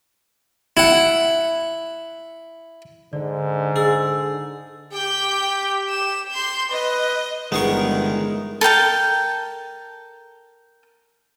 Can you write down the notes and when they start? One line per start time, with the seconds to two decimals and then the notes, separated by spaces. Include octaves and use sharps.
0.77 E4 F#5
3.13 G#2 D3 D5
3.76 D3 G#4 G#5 E6 A6
4.93 G4 G5 G6
5.89 E7
6.32 C6 G6
6.71 B4 D#5
7.52 G1 D#3 E3 G#3 B3 G#4 A#4 C#6
8.61 A4 A#4 G5 A5